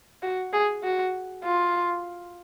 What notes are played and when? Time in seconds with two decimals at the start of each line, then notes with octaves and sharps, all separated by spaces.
0.22 F#4
0.53 G#4
0.84 F#4
1.44 F4